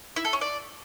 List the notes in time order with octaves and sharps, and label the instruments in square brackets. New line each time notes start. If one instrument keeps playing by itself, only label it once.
[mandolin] E4
A4
C#4
D5